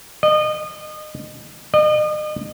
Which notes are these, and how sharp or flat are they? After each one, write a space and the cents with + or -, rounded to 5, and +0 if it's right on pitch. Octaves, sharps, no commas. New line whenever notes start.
D#5 -30
D#5 -40